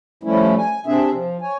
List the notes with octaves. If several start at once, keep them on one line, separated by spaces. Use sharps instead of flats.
F3 G3 A3 C#4 E4
G#5
C3 C4 D4 G#4 E5
F3
C#5 G#5